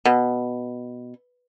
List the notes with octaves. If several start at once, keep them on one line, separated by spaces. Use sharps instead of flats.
B2